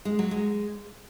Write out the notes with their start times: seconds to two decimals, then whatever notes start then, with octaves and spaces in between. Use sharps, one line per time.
0.05 G#3
0.19 F#3
0.31 G#3